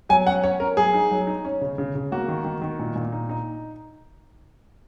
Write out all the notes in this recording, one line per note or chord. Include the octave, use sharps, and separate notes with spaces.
F#3 G#5
C#4 F#5
C#4 C#5
C#4 A#4
F#3 G#4
D#4
F#3
D#4
C#4
C#3
C#3
C#3
A#3 F#4
D#3
D#3
D#3
A#2
A#2
D#4
D#4